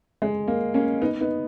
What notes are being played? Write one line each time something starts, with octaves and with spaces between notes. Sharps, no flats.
G#3
A#3
A#3 C#4
B3 D#4
B3 D#4